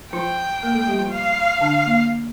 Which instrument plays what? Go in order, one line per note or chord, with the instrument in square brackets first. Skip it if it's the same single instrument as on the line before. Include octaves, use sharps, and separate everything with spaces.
[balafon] F3 F4 [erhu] G5
[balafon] A#3 A#4
A3 A4
G3 G4
F3 F4
[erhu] F5
[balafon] D3 D4
A#3